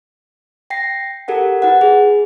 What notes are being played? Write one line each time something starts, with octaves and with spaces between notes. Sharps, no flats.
G5 A#6 C7
G4 A4 A#4 F#5
E4 B4 F#5
G#4